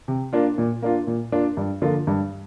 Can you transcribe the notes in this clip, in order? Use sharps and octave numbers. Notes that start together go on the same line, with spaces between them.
C3
A#3 D4 F4
A#2
A#3 D4 F4
A#2
A#3 D4 F4
G2
D3 F3 A#3 F4
G2